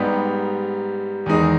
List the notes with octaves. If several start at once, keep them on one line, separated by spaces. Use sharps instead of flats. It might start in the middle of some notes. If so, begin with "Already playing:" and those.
Already playing: G#2 G3 B3 D#4 G4
E2 D#3 G#3 D#4 G#4